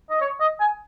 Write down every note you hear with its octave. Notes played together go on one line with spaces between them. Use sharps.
D#5
C#5
D#5
G#5